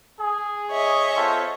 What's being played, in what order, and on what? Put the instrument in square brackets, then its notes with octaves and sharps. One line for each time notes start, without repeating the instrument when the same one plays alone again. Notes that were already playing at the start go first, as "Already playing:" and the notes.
[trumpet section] G#4
[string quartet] C#5 D#5 E5
[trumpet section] C4 F4 A4